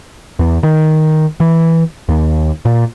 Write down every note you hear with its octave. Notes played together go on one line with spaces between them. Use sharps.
E2
D#3
E3
D#2
A#2